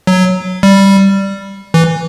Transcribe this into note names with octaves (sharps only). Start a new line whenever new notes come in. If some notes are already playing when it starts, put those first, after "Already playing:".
F#3
G3
E3